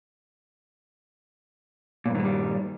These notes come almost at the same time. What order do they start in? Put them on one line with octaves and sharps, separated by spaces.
A#2 G2 D#3 G#3 G3